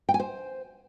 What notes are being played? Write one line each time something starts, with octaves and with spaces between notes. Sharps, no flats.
G5
G#5
C5